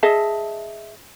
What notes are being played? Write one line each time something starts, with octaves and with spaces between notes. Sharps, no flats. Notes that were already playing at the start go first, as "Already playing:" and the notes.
G#4 D#5 E5 A5